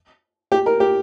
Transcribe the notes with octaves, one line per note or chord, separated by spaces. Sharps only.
G4
A#4
G4